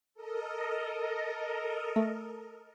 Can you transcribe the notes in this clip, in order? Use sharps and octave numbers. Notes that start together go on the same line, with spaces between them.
A4 A#4 D#5
A3